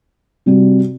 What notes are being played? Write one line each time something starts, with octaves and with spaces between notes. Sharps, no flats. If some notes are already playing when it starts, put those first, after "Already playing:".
C3 G3 C4 F#4